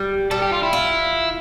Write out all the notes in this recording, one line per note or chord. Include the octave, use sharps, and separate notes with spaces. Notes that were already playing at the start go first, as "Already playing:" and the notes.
Already playing: G3
G3 A4
G4
F4
E4
F4